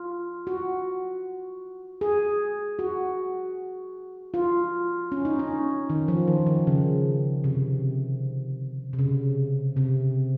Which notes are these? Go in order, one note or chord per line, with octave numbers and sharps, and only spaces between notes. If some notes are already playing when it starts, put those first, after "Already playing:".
Already playing: F4
F#4
G#4
F#4
F4
C#4
D#4
C#4
D#3
F3
D#3
D#3
C#3
C3
C3
C#3
C3